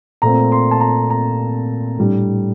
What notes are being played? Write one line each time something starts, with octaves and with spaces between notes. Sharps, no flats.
A#2 A3 C4 A#5
C6
A5
A#5
A#5
A2 G3 D4